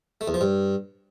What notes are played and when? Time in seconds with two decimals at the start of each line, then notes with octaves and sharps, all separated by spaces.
0.21 A3
0.28 E2
0.34 F3
0.41 G2